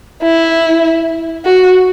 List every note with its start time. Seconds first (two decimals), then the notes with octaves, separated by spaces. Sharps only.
0.23 E4
1.45 F#4